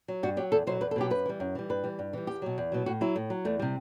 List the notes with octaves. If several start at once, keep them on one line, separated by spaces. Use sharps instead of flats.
F#3
G2 F#4
F#3 G4
E2 A4
B2 F#3 C5
E2 B4
A4
B2 F#3 G4
F#2 B4
E3 G3
F#2
E3 G3
G2 B4
E3 G3
G2
E3 G3
E2 G4
B2 F#3
E2
B2 F#3
A2 F#4
F#3 E4
A2
F#3
E2 A3
C3 G3